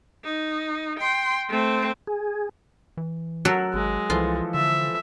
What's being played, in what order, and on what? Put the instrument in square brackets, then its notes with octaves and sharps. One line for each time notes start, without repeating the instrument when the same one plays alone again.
[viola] D#4
G5 C6
A3 C4
[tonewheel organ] G#4
[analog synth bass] E3
[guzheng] F#3 A4 A#4 [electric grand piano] E6 F#6
[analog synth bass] G#1 [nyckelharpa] G#3
[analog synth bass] C2 [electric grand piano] E3 F3 A4 [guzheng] F4
[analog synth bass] D3 [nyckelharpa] E5